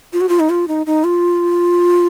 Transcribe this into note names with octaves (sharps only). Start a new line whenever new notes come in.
F4
F#4
F4
D#4
F4
D#4
D#4
F4